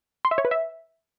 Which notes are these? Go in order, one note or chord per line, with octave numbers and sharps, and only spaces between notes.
C6
E5
C#5
B4
E5